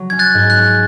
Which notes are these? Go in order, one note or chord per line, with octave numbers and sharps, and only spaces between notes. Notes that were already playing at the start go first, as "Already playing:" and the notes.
Already playing: F#3
C#4 G#6
F#6 A6
G#2
F#6
C#4